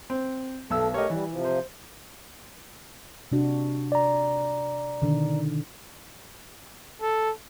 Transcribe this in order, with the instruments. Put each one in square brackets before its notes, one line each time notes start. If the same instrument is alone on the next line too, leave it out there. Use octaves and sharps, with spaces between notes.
[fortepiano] C4
[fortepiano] B1 E6 [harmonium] A3
[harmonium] A3 G4 A#4 [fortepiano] C#5 D#5
[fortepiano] E3 [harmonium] G3
[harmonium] C3 F3
[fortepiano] C5
[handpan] C3 D4 F#4
[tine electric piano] D5 A#5
[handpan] B2 D3 D#3
[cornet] A4